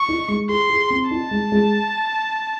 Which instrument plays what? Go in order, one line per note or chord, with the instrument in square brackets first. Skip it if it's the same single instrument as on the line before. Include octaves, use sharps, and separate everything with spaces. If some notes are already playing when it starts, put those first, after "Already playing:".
Already playing: [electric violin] C#6
[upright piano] D#4
G#3
[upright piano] G#4 [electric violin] C6
[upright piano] G#4
C4
[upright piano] D#4 [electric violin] A5
[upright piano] G#3
G#3